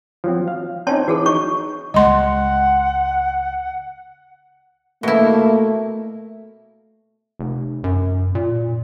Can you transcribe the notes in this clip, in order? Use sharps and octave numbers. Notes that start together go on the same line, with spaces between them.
F3 F#3 C4
F5
C4 C#4 D#4 C#5 A5 C6
E3 F#4 G#4 A4
D#4 C#5 C#6
C#2 G#3 D#5 F#5 C6
B2 A3 A#3 E4
F1
F#2
A#2